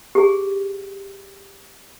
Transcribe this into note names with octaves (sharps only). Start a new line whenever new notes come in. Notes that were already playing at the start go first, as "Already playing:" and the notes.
G4 G#4